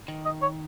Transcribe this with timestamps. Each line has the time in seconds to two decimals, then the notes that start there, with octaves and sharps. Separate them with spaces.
0.08 D#3
0.25 D#5
0.42 C#5